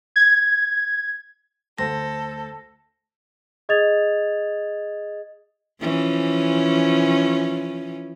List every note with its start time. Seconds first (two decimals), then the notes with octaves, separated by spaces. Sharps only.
0.16 G#6
1.78 D2 A4 C5 A#6
3.69 G#4 D#5 D#6 G#6 A6 F7
5.81 E3 F3 C#4